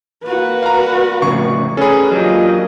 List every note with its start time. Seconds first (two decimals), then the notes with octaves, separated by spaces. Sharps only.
0.24 A#3 F#4 B4
0.63 G3 F5 A#5
1.22 F2 A2 C#3 C#6
1.77 C#4 G#4 A4 B4
2.11 A#2 F#3 D4 F4 G4 D#5